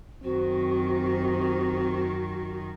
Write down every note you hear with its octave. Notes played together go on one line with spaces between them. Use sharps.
F#2 D#3 C4 F#4